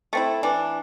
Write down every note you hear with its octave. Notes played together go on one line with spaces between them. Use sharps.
A3 C4 E4
E3 D4